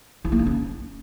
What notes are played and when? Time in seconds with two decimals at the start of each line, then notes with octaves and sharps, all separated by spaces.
0.25 E4
0.32 A#3
0.39 D#4
0.46 C#4